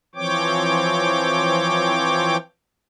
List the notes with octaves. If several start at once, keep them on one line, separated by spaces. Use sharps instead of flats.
E3 F3 C4 C#5 G5 D6